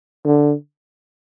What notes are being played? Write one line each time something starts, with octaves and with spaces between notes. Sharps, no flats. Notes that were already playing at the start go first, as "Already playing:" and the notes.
D3